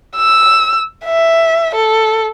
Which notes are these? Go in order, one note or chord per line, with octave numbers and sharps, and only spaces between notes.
E6
E5
A4